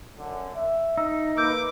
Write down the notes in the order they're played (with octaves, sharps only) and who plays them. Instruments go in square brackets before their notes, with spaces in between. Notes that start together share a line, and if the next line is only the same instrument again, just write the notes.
[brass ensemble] F#2 D3
E5
[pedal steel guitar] D#4 [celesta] E6
[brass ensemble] A#3 B4 [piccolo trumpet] D6 [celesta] E6 G6